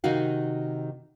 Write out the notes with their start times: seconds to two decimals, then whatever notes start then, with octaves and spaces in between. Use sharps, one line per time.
0.04 C3 D#3 D#4 F#4 F5